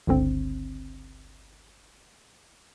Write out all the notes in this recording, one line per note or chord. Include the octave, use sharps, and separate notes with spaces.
G1 C#2 D3 C4